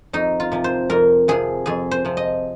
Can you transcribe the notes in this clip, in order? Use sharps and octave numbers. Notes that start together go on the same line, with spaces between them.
F2 D#4
F4
C3 F3
C5
F2 A#4
C3 F3 G#4
F2 G#4
C5
C3 F3
D#5